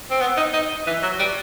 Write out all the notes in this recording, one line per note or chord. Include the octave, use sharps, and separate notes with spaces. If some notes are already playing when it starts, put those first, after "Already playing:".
C4
B3
D#4
D#4
E3
F#3
G3